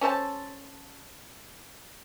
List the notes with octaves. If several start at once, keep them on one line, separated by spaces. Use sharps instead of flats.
C#4 A4 C5 A5